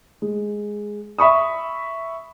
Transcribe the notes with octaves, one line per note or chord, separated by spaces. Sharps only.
G#3
E5 B5 C#6 D#6